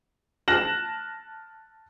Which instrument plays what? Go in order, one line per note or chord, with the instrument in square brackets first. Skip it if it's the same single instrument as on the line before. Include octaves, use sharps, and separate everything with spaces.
[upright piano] A5 F6 F#6 A#6 E7 F#7